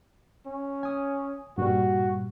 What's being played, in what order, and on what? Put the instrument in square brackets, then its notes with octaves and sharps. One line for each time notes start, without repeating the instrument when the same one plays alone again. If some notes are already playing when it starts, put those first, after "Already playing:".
[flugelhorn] C#4
[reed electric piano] G#5 D#6
[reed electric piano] G2 A#2 G3 [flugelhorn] F#4